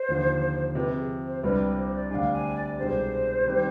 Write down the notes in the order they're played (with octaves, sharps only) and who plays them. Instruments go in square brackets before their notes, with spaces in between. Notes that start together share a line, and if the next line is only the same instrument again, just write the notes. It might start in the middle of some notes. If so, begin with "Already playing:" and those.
Already playing: [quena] C5
[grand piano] D#2 D3 F3
[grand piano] C3 F3 C4 [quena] B4
[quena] G#4
C5
[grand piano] C2 C3 G3 D4 G4 [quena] B4
[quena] C5
D5
[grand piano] D2 C3 G3 D4 [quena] F5 G#5
[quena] G#5
D5
[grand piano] C2 B2 G#3 D4 G4 [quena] C5
[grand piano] D#3 G3 C4 G4